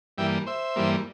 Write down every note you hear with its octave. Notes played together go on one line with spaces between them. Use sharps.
G2 E3 G3 A#3 E5 G5
C5 E5
G2 E3 G3 A#3